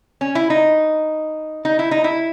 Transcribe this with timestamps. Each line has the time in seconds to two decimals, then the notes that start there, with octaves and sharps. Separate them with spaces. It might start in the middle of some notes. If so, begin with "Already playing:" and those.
0.21 C#4
0.35 E4
0.50 D#4
1.65 D#4
1.79 E4
1.91 D#4
2.04 E4